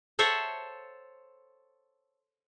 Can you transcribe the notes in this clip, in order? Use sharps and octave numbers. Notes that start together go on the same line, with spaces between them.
A4 C5 C#5 E5 F#5